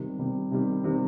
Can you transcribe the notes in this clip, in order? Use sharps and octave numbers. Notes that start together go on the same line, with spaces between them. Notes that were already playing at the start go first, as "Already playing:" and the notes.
Already playing: C3 D#3 G3
C3 D#3 G3
C3 D#3 G3
C3 D#3 G3